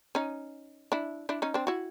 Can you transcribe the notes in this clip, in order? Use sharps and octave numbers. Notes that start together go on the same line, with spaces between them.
C#4 D#4
D4 E4
D4 E4
C#4 D#4
C4 D4
E4 F#4